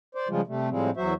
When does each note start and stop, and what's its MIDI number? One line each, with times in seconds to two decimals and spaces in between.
0.15 0.28 72
0.15 0.28 74
0.29 0.41 49
0.29 0.41 53
0.29 0.41 55
0.29 0.41 56
0.29 0.41 65
0.47 0.69 48
0.47 0.69 55
0.47 0.69 57
0.69 0.90 45
0.69 0.90 53
0.69 0.90 55
0.69 0.90 56
0.69 0.90 60
0.97 1.14 40
0.97 1.14 54
0.97 1.14 66
0.97 1.14 72
0.97 1.14 76